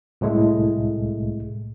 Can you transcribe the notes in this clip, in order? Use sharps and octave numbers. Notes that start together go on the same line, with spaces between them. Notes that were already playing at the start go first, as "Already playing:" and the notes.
C2 A2 G#3 A3